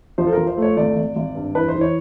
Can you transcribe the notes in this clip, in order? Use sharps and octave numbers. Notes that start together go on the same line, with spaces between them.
F3 C5
A4
F3 A#4
C5
A3
C#5
G#1 D5
G#1
G#1
G2
E3 B4
C5
E3
C#5